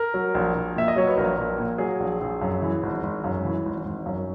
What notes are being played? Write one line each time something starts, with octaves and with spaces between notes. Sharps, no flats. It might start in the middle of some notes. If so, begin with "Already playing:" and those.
Already playing: A#4
F#3
A#1
A#1
A#2 E5
D#5
F#3 C#5
B4
A#1 A#4
A#1
A#2
F#3 G#4
A#1
A#1
F#2
E3
G#1
G#1
F#2
E3
G#1
G#1
F#2